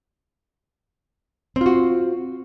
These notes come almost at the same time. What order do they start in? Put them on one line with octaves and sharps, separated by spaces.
C4 F4 F#4